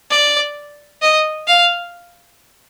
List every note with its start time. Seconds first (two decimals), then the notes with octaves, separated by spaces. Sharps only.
0.11 D5
1.02 D#5
1.47 F5